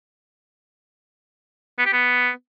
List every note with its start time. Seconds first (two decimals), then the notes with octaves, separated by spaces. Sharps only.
1.79 B3
1.86 G4
1.93 B3